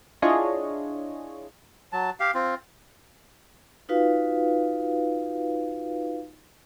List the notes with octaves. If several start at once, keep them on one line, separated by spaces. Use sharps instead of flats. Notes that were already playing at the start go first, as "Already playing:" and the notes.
D4 E4 F4 G#4 C#5 D#5
F#3 A5
G4 F5
C4 F4
D#4 F4 F#4 B4 F5